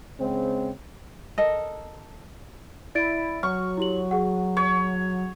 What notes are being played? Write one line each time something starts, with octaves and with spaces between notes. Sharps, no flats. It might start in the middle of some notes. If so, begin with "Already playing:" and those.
C#3 G#3 C4
A4 A#4 D#5
E4 D5 A6 D7
F#3 C#6 F6
E4 G4 F#7
G#4 F#5
C#5